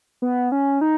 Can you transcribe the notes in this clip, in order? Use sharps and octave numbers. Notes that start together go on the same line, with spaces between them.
B3
C#4
D#4